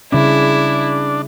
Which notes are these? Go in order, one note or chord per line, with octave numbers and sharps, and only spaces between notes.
C#3 G3 C#4 D4 E4